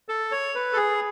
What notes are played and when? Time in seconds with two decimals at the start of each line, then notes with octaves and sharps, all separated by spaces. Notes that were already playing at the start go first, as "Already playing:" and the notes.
0.09 A4
0.32 C#5
0.55 B4
0.73 A4
0.76 G#4